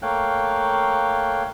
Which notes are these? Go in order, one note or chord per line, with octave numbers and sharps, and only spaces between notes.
A3 A#3 C#5 F5 G5 F#6